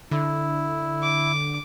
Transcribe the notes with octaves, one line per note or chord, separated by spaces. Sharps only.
D3 E4
D6